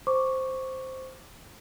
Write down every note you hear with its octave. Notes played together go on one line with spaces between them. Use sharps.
C5 C#6 D6